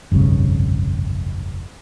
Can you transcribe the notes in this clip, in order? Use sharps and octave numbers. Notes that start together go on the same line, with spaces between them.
F1 B1 G2 C#3